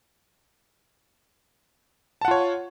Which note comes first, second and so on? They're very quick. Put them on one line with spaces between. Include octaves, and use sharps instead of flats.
A5 F#5 F4 C#5